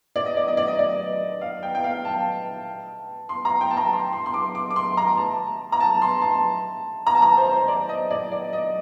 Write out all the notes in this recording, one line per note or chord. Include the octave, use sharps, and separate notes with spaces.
D5
D#5
D5
D#5
D5
D#5
D5
F5
G5
G5
F5
A5
C6
A#5
G5
A5
A#5
C6
C6
C6
D6
D6
D6
C6
A#5
A5
A#5
A5
C6
A5
A#5
A5
A#5
C5
C5
D5
D#5
D5
D5
D#5